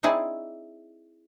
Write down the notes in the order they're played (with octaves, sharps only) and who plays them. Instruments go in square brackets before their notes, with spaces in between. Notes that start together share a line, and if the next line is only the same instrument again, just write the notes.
[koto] C4 D#4 E4 G#4 D5